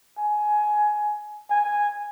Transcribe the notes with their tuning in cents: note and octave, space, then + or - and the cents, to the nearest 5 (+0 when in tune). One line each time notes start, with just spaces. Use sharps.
G#5 +15
G#5 -5